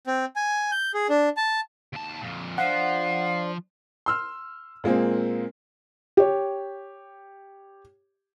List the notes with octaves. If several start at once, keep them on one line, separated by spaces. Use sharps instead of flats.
C4
G#5
G6
G#4
D4
A5
D#2 A5
F2 A#2
F3 D4 C5 F5 F#5
C6 E6 F6
A#2 G#3 A#3 C4
G4 C#5